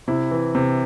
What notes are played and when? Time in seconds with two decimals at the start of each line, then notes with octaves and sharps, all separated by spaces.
0.08 C3 E4
0.31 E3
0.55 C3